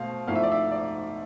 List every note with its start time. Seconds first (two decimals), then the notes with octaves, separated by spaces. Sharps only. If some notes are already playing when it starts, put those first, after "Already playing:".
Already playing: B2 A3 C5 F5
0.27 G#2 F3 A3 E4 F5
0.35 E5
0.43 D5
0.52 E5
0.71 D5